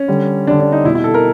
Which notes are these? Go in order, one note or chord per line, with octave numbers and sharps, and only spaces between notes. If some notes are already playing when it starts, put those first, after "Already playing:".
Already playing: C#4
D3 G3
D3 G3 D4
D4
D#4
B2 G3 E4
E4
A4
A#4